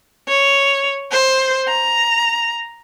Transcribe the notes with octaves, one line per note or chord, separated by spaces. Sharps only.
C#5
C5
A#5